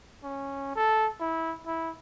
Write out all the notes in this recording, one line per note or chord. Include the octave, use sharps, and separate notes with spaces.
C#4
A4
E4
E4